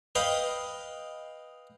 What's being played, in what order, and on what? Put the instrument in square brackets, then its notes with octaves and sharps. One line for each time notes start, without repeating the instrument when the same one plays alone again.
[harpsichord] B4 D#5 F5 G5